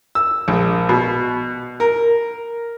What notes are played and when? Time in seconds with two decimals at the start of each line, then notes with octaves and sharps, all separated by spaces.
0.15 E6
0.48 A#1
0.89 B2
1.80 A#4